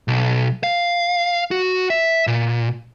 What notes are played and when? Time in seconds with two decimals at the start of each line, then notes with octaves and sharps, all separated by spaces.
0.08 B1
0.63 F5
1.51 F#4
1.90 E5
2.27 A#2